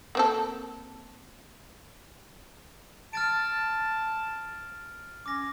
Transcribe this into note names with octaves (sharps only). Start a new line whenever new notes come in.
A#3 C4 A4
A5 F6 A6 D7
C#4 D6 A#6